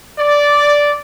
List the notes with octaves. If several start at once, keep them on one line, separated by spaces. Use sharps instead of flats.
D5